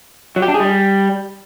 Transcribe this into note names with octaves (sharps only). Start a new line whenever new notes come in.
F#3
G4
D4
G#4
G3